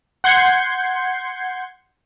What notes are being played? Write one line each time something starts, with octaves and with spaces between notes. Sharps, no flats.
F#5 C6 G6 G#6 C7 C#7